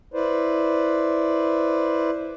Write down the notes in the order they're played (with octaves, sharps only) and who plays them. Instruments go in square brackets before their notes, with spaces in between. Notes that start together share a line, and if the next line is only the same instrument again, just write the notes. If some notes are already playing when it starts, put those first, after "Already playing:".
[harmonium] E4 B4 C5 D5